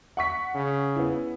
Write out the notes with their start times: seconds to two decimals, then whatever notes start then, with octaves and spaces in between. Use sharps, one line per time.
0.17 F#5 C#6 B6
0.55 C#3
0.96 B3 E4